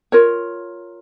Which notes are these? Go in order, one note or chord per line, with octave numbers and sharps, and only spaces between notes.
F4 A#4 C#5